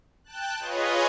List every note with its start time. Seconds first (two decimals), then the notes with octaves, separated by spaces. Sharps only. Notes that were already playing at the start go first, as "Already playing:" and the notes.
0.24 G5 A5 F#6
0.59 F4 G#4 B4 C#5 D#5